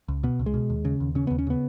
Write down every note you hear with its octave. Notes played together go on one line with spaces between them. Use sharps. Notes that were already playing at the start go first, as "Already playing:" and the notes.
C#2
B2 B3
C#2
G#3
B2
D#2
C#3
D#2
C#3 C#4
B3
D#2
C#4
C#3 B3